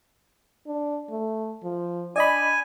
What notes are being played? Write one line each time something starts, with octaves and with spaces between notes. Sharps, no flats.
D4
A3
F3
D4 D5 D#5 G#5 B5